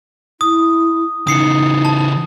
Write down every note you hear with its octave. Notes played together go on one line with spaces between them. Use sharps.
E4 D#6
C#3 E3 D#4 D#6 C7 C#7
A5